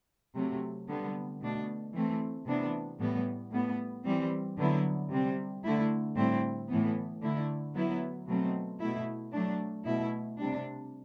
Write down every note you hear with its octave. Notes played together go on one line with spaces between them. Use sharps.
C3 F#3 A3
D3 G3 B3
B2 A3 D4
E3 A3 C4
C3 E3 B3 D4
A2 E3 G3 B3
A2 G3 B3
E3 G3 C4
D3 F#3 B3 E4
C3 G3 C4
D3 A3 E4
A2 G3 C4 E4
A2 E3 B3
D3 A3 E4
F#3 B3 E4
B2 F#3 A3 C4
B2 A3 E4
F#3 A3 D4
B2 A3 E4
C3 G3 D4